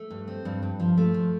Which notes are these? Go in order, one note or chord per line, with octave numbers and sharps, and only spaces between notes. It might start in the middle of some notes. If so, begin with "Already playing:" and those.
Already playing: A3
G2
C4
G2
G2
F3
A3
F3